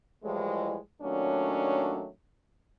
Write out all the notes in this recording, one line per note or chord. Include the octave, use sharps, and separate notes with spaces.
A2 E3 F3 G3 G#3
A#2 D#3 F#3 A3 C#4 D4